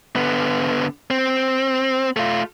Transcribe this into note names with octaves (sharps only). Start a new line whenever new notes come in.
D3 B3
C4
A3 F4